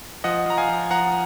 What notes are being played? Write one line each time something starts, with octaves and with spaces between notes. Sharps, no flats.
F3 D#5 F#5
F3 A#5
F5 G#5
F3
F3 F#5 A#5